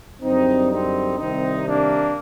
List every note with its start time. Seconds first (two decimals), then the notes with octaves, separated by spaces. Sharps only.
0.22 F#2 D3 G3 C4 D#4
0.70 C4 D#4
1.18 C2 C3 D#3 G3 C4 D#4
1.66 A#3 D4